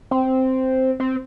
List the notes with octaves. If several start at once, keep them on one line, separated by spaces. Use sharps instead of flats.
C4
C4